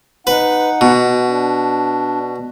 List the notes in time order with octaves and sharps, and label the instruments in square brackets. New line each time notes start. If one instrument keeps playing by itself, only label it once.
[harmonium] D#4 F#5 [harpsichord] B4
[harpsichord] B2
[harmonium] D4